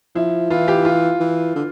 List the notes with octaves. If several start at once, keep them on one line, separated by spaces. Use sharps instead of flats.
F3 E4
E3 F4
G4
F4
E3
D3